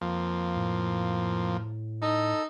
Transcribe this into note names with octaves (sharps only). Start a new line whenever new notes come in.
F2 F3 A#3
A2
D#4 A4